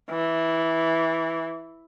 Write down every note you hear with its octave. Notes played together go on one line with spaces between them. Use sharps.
E3